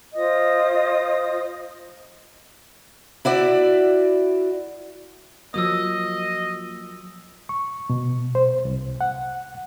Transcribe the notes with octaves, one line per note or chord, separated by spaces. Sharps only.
F4 C5 D#5 D#6
E4 F#4 D5 E5
F3 F#3 A#3 D#5 D#6 E6
C#6
B2
C5
C2
F#5